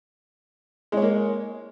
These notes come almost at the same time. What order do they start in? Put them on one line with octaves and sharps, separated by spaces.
G#3 C#5 A#3